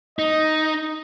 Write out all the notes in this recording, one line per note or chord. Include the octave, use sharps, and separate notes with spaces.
D#4 D#5